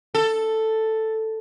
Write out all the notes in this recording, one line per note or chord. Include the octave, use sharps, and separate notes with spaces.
A4